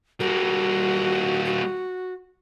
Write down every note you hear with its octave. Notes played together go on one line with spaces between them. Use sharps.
G3 A#3 F#4
F#4